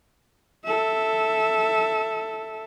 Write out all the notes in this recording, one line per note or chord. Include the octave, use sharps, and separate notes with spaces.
A4 E5